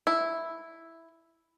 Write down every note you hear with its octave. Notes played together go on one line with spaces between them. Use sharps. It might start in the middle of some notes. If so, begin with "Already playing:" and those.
E4